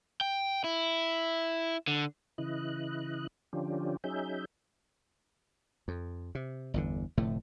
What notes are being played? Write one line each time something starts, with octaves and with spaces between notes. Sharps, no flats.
G5
E4
D3
C#3 E3 E4 D#5 F#6
D3 F3 C#4 D4 F4 G4
F#3 C#4 D#4 G#4 E5 G6
F2
C3
G1 E2 D3
F1 A2 D3 A3